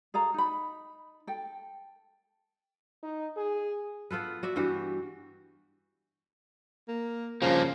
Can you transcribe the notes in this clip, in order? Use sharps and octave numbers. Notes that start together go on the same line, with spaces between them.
G#4 A4 F5 A#5
D#4 B5
A4 G5
D#4
G#4
B3 F4 A4 B4
F#4 D5 E5
G2 E3 F#4 G4
A#3
G2 C#3 F3 A#3